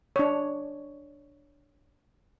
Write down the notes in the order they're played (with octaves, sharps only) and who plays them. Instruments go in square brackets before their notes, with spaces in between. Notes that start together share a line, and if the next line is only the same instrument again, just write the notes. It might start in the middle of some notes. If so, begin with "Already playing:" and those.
[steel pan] D4 C#5